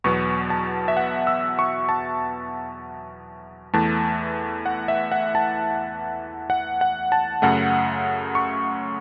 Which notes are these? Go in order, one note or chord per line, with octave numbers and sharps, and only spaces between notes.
E2 B2 F#3 B3 C#6
A5
E5
F#5
E6
C#6
A5
E2 E3 A3 A5
F#5
E5
F#5
A5
F#5
F#5
A5
F#2 C#3 A3 F#5
C#6